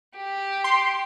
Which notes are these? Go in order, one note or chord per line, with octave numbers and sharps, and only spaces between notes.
G4
C6